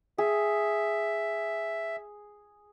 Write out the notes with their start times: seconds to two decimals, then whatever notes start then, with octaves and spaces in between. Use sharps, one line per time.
0.18 G#4 E5